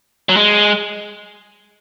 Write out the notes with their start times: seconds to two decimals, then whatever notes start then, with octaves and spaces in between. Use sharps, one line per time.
0.29 F#3
0.37 G#3